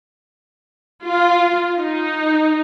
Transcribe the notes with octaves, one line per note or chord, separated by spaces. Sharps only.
F4
D#4